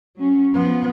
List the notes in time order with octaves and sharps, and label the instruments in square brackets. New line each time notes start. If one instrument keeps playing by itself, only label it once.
[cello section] F#3 C#4
[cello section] F3 [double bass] B3